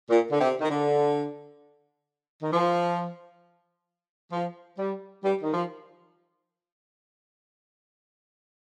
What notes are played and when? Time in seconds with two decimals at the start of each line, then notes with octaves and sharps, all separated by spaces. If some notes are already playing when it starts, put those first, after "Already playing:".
0.10 A#2
0.32 D3
0.41 C3
0.61 D#3
0.70 D3
2.43 D#3
2.53 F3
4.33 F3
4.78 G3
5.24 G3
5.43 D#3
5.54 F3